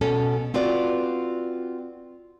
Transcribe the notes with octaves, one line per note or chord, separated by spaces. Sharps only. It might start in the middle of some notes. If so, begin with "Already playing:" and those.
B2 C#4 A4
C4 F4 F#4 B4 D5